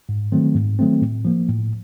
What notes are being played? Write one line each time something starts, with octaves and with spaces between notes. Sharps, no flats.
G#2
D#3 F#3 A3 C4
G#2
D#3 F#3 A3 C4
A2
F3 A#3
A2